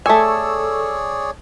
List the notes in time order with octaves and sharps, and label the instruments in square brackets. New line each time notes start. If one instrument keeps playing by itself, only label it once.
[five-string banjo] A3 G#5 [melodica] G#4 C#5 D5 [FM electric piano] A4 C#6 E6